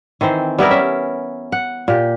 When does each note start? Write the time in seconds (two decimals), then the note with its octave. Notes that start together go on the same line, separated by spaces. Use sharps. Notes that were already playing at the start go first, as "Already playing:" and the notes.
0.21 D#3 E3 C4 C5
0.59 G3 B3 E4 A#4
0.70 C#4 E5
1.52 F#5
1.88 A#2 G4